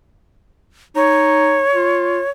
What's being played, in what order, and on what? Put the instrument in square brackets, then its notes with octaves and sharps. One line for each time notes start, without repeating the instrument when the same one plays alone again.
[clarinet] D#4 [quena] C#5
[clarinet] F4